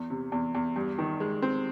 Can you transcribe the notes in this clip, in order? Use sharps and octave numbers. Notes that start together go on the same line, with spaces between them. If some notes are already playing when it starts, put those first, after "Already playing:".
Already playing: E2
C3
E2
E2
G2
D#3
G#3
C4